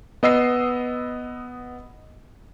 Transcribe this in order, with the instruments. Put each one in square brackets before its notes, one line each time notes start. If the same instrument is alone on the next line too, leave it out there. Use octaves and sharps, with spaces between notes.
[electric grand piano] B3 D#5 E6 C7